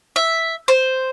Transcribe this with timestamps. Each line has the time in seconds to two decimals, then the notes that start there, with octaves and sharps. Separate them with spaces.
0.16 E5
0.68 C5